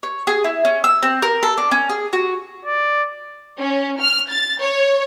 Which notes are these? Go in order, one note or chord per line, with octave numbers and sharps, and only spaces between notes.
C#5
G#4
E4
C#4
E6
C4
A#4
A4
D4
C#4
G#4
F#4
D5
C#4
F6
A6
C#5